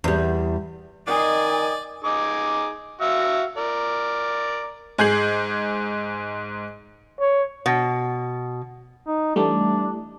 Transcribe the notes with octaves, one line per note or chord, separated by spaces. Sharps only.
E2 G3
D#3 D5 D#5 G#5 D#6
D#4 G#4 D6
F#4 E5 F5
A#4 D5
G#2 G#4 G6 G#6 C7 F#7
C#5
B2
D#4
E3 G3 A3 D4